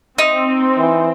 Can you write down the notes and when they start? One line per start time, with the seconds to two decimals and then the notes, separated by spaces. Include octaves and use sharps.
0.18 C4 D#4
0.78 E3